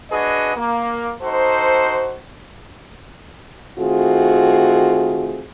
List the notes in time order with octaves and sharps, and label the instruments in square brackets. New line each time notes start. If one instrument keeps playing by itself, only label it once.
[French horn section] D4 F#4 G#4 B4 D#5
A#3
D#4 F#4 A4 C5
D#3 A3 C4 F4 F#4 G#4